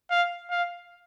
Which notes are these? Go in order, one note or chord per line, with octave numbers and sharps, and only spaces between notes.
F5
F5